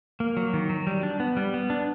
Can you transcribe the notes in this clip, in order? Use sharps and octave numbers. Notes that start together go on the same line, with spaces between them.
A#3
F#3
D#3
F#3
G3
D4
B3
G3
B3
D4